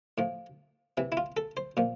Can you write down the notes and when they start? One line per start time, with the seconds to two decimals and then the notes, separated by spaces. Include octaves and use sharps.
0.18 A2 F3
0.97 C3 E3
1.12 E4
1.17 F4
1.37 A4
1.57 C5
1.77 A#2 F3